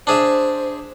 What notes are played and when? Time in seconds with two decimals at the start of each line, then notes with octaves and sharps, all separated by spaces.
0.07 D4 G#4 C5 E5